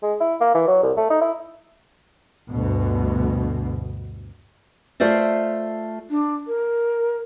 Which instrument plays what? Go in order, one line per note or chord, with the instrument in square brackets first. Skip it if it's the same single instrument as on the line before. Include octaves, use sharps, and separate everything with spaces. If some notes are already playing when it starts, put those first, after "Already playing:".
[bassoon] G#3
E4
A#3
E3
F#3
C2
A3
D#4
E4
[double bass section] D2 G2 B2
[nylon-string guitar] A3 F4 C5 D5 E5
[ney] D4
A#4